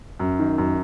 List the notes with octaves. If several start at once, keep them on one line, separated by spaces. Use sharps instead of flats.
F#2
D#3
F#2